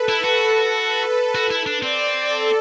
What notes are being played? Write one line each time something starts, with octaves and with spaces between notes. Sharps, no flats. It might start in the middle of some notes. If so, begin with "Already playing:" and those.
Already playing: A4 B4
E4
F#4
A4
B4
F#4
E4
D4
C4 D5
A4